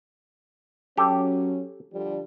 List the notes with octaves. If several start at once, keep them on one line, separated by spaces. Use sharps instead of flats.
F#3 C#4 G4 A4
D3 F3 G3